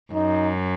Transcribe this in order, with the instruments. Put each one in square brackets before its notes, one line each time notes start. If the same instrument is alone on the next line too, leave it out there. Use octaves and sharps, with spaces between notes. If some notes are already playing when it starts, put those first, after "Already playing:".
[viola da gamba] F#2 [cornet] D#4